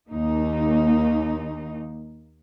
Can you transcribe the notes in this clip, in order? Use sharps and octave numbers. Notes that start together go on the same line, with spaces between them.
D#2 A#3 D#4